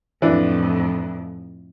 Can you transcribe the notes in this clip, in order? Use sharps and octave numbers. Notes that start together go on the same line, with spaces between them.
F2 A2 E3 D4